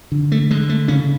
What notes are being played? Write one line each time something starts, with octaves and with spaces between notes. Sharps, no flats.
D3
A3
D3 G#3
A3
C#3 C#4